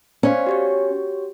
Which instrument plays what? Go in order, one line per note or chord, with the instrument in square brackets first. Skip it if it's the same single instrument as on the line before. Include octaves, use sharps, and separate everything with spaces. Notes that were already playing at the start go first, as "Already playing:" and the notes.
[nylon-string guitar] C#4 [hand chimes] C5 D5 F5
[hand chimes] F#4 G4 C#5